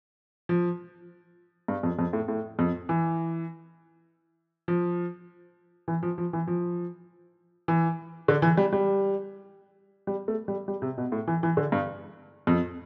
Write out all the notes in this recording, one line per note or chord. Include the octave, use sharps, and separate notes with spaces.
F3
G2
F2
F2
A2
A2
F2
E3
F3
E3
F3
F3
E3
F3
E3
D3
E3
G3
G3
G3
A3
G3
G3
C3
B2
A2
E3
E3
D3
G2
F2